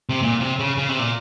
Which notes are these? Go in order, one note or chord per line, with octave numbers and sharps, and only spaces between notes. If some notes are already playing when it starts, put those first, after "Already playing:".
C3
A#2
C3
C#3
C#3
C3
A#2